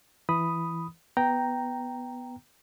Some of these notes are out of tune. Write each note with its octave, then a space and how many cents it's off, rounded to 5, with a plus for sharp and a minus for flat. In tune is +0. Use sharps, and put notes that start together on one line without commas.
E3 +10 B5 +0 D#6 +0
B3 +0 G5 -5 A#5 +0